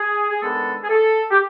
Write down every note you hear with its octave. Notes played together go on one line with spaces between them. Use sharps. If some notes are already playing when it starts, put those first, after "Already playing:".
Already playing: G#4
G#4
D#3 G#3 B3 D4 A4
G#4
A4
G4